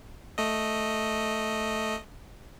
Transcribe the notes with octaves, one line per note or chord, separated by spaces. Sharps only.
A3 D#5